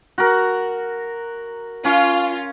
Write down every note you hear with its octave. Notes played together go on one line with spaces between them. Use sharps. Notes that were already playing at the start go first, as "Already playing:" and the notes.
F#4 A#4
C#4 F4